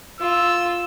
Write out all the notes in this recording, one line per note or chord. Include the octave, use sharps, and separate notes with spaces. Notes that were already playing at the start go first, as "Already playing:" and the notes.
F4 E6